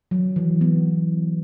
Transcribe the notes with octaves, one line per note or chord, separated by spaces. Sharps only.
F#3
E3
B3